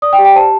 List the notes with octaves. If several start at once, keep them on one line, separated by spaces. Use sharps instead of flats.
D5 D#6
G5
G4
G5
C5 A5